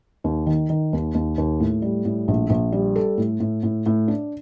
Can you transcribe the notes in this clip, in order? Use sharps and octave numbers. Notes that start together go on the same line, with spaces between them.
D#2
D#3
D#3
D#2
D#2
D#2
A2
G3
A2
A#1
A#1
G3
A4
A2
A2
A2
A2
D4